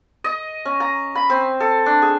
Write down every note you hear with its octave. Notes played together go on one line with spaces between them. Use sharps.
D#5
C#4
A#5
B5
C4
A4
D4
G#4